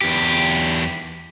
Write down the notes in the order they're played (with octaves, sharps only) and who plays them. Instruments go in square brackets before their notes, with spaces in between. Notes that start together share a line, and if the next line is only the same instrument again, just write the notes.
[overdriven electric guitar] E2 G4